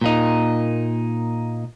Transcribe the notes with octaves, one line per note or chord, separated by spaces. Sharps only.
A#2 A#3 D#4